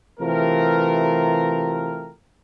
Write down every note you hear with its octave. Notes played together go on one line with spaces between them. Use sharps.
C3 E3 A3 F4 G4 A#4